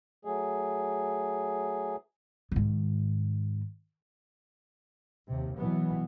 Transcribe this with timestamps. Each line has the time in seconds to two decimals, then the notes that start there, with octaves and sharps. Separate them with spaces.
0.25 F#3 A3 G#4
2.51 G#2 D#3
5.28 D#2 C3
5.57 B2 E3 F#3 B3